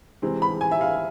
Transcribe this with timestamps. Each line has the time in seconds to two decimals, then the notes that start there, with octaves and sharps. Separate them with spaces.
0.22 C3 E3 G#3 C4
0.42 B5
0.61 G#5
0.71 E5
0.81 F5